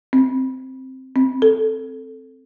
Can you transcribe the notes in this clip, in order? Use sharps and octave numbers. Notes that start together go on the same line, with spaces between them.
C4
C4
A4